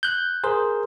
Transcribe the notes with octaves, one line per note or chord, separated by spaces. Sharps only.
F#6 G6
G#4 A#4 C5